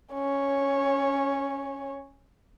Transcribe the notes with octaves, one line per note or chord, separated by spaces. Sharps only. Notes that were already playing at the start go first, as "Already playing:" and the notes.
C#4 C#5